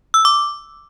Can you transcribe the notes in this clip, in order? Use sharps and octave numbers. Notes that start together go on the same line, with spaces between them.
E6
D6